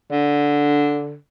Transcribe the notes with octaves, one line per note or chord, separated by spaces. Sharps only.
D3